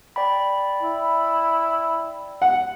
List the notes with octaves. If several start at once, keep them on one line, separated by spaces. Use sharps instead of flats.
D5 G5 B5
E4
F#5